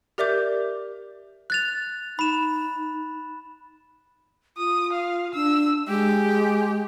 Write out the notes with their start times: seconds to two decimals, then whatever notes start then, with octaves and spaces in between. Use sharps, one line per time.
0.18 G4 A#4 D5 E5 D6 G6
1.50 F#6 A6 F7
2.19 D#4 B5 E7
4.57 F4 D#6
4.92 F5
5.34 D4 E6
5.88 G#3 G4